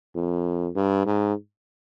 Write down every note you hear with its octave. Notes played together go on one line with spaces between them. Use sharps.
F2
G2
G#2